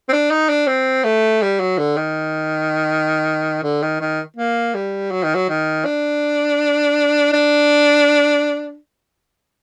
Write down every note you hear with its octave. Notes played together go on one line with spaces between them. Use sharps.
C4
D4
D#4
D4
C4
A3
G3
F#3
D3
D#3
D3
D#3
D#3
A#3
G3
F#3
D#3
F#3
D#3
D4
D4